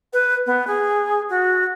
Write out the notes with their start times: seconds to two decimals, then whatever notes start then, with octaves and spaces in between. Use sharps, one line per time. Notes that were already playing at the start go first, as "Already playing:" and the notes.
0.13 B4
0.46 B3
0.67 G#4
1.30 F#4